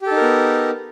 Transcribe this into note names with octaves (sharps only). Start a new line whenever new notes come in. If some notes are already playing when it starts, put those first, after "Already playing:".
B3 D#4 G4 A4 A#4